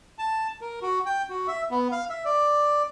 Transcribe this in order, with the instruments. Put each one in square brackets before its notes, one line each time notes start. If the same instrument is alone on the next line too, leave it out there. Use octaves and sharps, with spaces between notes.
[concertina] A5
A#4
F#4
G5
F#4
E5
B3
F5
E5
D5